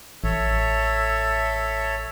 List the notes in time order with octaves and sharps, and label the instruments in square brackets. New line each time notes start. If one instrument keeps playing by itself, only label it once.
[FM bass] A1 [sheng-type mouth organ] A4 C#5 E5